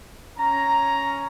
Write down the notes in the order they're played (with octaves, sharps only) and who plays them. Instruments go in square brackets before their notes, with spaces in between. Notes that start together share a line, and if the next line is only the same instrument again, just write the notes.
[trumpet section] C#4 A#5